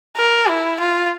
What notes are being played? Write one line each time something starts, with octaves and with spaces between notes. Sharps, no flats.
A#4
E4
F4